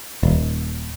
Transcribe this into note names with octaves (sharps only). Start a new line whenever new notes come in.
D#1